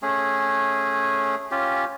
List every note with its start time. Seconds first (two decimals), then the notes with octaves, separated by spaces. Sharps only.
0.02 A3 C#4 G#4
1.51 C#4 F4 G4